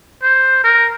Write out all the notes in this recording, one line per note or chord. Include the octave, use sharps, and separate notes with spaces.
C5
A#4